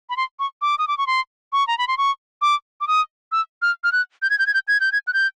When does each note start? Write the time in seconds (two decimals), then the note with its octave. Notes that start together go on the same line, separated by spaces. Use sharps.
0.10 B5
0.17 C6
0.39 C#6
0.62 D6
0.78 D#6
0.88 D6
0.98 C#6
1.07 C6
1.53 C#6
1.67 A#5
1.78 B5
1.88 C6
1.98 C#6
2.42 D6
2.81 D6
2.88 D#6
3.32 E6
3.62 F6
3.84 F6
3.92 F#6
4.22 G6
4.30 G#6
4.39 G6
4.47 G#6
4.54 G6
4.68 G#6
4.80 G6
4.92 G#6
5.07 F#6
5.14 G6